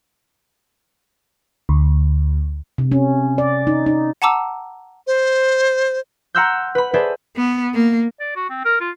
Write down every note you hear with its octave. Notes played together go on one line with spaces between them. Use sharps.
D2
C3
C#4
D5
D#4
D#4
F#5 A5 A#5 D6 E6
C5
F#5 A#5 C6 E6 F#6 G6
B4 B5
G#4 A4 B4 C5 D5 E5
B3
A#3
D5
F#4
C4
A#4
F4